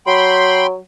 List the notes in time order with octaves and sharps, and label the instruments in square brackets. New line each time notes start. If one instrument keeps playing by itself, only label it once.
[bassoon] F#3 [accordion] G5 B5 C6